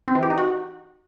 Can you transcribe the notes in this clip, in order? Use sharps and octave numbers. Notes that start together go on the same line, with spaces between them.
C4
E3
G4
D#4
F#4